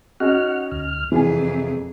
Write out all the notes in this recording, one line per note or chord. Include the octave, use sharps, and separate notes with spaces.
C#4 D#4 F#4 F#5 F6
D2 F6
E1 F2 C3 E3 G#4 G#5